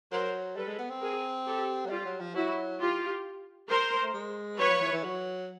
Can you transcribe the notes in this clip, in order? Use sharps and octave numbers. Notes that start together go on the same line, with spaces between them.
F#3 A#4 C5
G3 A4 B4
G#3
B3
C4
G#4 A#4
G4 A4
F#3
G3 F4 G4
F#3
F3
F#3 E4 F#4
F4 G4
A#4 C5
A3
G#3
F#3 B4 C#5
F3
E3
E3
F#3